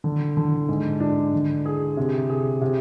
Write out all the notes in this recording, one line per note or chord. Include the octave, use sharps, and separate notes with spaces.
D3
D3
G#2
D4
D3
G#4
C3
G#4
C3